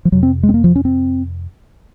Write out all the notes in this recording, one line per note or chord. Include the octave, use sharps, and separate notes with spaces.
F3
F2 C3 F#3
C4
G#3
C4
A#3
F3
C#4
C4